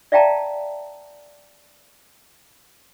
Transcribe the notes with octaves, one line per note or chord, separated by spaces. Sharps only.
D5 E5 F5 G5 A5 A#5